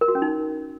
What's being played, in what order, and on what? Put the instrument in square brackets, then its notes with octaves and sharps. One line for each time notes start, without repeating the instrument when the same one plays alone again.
[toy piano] A#4
F#4
C#4
D#4